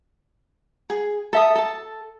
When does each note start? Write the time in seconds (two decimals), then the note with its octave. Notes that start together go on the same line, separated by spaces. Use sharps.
0.90 G#4
1.33 A4 E5 D#6
1.55 A4 A5